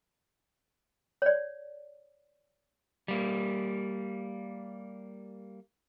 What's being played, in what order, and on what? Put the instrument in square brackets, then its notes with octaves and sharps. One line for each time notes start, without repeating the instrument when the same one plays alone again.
[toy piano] C#5 D5
[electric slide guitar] G3 A#3